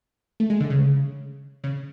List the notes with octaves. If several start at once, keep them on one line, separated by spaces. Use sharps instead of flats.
A3
G#3
D3
C#3
C#3